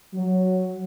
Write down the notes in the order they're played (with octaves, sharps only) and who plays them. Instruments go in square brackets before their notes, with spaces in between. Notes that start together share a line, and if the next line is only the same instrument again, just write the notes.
[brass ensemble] F#3